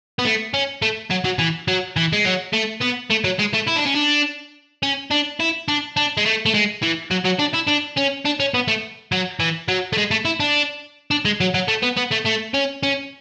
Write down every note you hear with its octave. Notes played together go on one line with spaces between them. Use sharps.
B3
A3
C#4
A3
F#3
F#3
E3
F#3
E3
G#3
F#3
A3
B3
A3
F#3
G#3
A3
E4
D4
C#4
D4
C#4
D4
E4
D4
D4
G#3
A3
A3
G#3
E3
F#3
F#3
D4
E4
D4
C#4
D4
C#4
B3
A3
F#3
E3
F#3
A3
G#3
A3
E4
D4
D4
G#3
F#3
F#3
A3
B3
B3
A3
A3
C#4
C#4